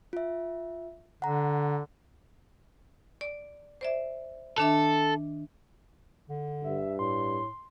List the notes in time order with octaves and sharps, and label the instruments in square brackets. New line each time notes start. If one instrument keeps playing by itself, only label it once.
[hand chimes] F4 E5
[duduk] D3 [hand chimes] F#5 A#5
[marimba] D5
C5 D5 E5
[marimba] D#3 D4 E5 [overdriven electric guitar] A4
[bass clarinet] D3
[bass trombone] G2 [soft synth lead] E5
[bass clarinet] A2 [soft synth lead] C6